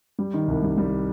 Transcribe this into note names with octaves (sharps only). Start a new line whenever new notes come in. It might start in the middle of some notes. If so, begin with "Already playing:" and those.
G3
D#3
C2
G3
G3